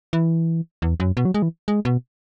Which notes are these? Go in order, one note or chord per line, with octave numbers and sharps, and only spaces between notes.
E3
E2
F#2
B2
F#3
G#3
E3
G#3
B2